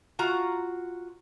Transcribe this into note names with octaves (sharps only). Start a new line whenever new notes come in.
F4 F#4 A#5